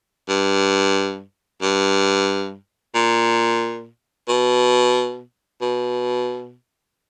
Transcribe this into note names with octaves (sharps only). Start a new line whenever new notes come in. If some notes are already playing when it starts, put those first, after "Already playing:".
G2
G2
A#2
B2
B2